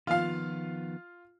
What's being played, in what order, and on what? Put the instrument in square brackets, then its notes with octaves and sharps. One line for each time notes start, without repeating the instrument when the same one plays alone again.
[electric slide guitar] D#3 F3 B3 [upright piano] F4 F5